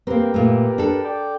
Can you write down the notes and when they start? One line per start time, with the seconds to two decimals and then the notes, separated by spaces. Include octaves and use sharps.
0.07 A#3 C4 G4 A#4 B4
0.34 A#2 A3
0.78 D4 A4
1.05 D5 G5